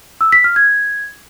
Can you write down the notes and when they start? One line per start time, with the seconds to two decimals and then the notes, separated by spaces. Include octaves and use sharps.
0.21 E6
0.32 B6
0.44 F6
0.56 G#6